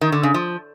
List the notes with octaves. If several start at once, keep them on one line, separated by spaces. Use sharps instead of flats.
D#3
D3
C#3
F3